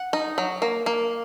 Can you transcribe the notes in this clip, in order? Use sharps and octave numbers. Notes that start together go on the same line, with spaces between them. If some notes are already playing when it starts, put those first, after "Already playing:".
Already playing: F#5
D#4
F#3
A#3
A#3